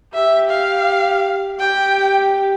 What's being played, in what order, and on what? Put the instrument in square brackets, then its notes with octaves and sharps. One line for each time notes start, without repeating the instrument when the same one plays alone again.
[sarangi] G4 [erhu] E5
[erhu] F5
[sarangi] G4 [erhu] G5